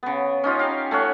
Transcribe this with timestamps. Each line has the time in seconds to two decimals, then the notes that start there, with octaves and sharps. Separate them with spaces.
0.03 C#3 B3
0.44 C#4 D#4 F4
0.59 G4 F5 G5 A#5
0.91 A3 C#4 C#5 F#5